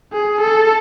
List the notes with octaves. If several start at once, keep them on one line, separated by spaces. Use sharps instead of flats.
G#4
A4